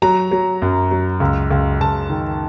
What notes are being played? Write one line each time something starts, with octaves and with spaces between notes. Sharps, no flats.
F#3 A#5
F#3
F#2
F#3
C#2
C#2
C#2 A5
D#3